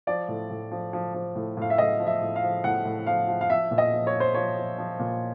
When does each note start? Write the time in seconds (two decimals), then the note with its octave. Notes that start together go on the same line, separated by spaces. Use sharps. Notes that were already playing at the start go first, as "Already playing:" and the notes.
0.07 F3 D5
0.28 A2
0.50 A2
0.71 F3
0.93 F3
1.14 F3
1.35 A2
1.57 A2 F5
1.70 E5
1.78 A2 D#5
2.00 F3
2.07 E5
2.21 A2
2.36 F5
2.42 F3
2.64 A2 F#5
2.85 A2
3.07 F3 F5
3.28 F3
3.41 F5
3.49 F3 E5
3.71 A#2
3.78 D#5
3.92 F3
4.07 C#5
4.14 F3
4.20 C5
4.34 F3 C#5
4.57 F3
4.78 F3
4.99 A#2